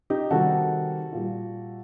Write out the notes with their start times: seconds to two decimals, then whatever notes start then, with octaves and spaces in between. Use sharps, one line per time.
0.10 D#4 G4
0.31 C3 D#3 G3 F#4 A4
1.13 A#2 G3